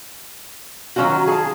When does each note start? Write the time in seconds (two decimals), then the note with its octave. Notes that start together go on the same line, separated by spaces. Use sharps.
0.96 D#3 F#3 A#3 C#4 F4 F#4
1.27 G#4 A5